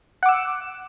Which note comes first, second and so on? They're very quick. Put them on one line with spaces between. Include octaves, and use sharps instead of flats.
F#5 D6 E6